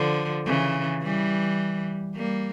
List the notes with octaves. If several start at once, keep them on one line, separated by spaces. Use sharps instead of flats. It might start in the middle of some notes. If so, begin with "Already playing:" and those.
Already playing: D3 F3
C#3 E3
E3 G3
G3 A#3